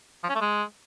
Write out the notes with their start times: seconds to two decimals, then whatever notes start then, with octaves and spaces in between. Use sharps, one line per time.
0.24 F3
0.29 C#4
0.35 A3
0.41 G#3